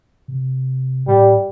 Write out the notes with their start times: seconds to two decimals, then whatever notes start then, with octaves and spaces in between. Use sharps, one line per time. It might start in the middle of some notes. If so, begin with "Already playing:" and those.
0.28 C3
1.07 A2 G3